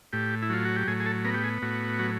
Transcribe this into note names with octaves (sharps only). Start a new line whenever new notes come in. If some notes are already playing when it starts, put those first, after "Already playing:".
A2 G4
E4
F#3 F4
F#4
G4
A2 G#4
G#4
A4
B3 A#4
G4
G#4
A2 F#4
F#3